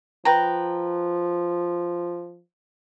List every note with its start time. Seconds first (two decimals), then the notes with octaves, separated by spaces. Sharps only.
0.25 F3 B4 G5 A#5